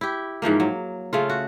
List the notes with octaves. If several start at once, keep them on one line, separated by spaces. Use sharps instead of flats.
E4 G4
G#2 E3 F3 A#3
F#3
C#3 A3 F4
F#4